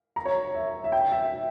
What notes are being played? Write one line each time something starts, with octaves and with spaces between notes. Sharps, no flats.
A#5
C#5
E5
E5
G5
E5